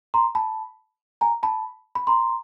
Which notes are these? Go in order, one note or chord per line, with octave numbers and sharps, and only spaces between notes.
A#5 C6
A5 B5
G#5 A#5
A5 B5
B5
A#5 C6